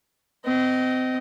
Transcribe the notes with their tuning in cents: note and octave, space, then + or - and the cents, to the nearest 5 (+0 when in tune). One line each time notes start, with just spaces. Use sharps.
C4 -30 D#5 -5